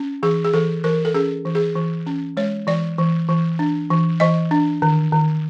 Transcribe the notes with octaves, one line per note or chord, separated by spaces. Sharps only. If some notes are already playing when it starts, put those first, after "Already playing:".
Already playing: C#4
E3 G#4
G#4
E3 A4
E3 A#4
A4
C#4 G#4
E3
G#4
E3
C#4
G#3 C#5
E3 D5
E3
E3
D4
E3
E3 D#5
D4
D#3
D#3